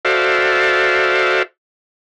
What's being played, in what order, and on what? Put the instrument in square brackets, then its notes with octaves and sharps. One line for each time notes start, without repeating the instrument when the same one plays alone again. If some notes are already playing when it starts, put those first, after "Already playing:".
[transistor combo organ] F#4 A4 C5 D5 E5 F5